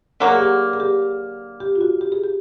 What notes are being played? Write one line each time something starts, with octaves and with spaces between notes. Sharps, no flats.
D3 F#3 A#3
G#4
G4
G#4
G#4
G4
G4
F4
F#4
G4
G#4
G4